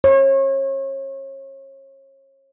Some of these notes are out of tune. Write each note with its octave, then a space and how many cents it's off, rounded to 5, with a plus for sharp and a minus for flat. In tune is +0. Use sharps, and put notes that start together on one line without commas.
C#5 -35